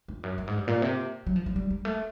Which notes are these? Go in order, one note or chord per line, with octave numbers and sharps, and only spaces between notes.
F2
F#2
G2
G#2
G2
A#2
C3
F#3
F3
F#3
G3
G3
A3